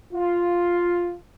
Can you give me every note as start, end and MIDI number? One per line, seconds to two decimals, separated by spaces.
0.13 1.16 65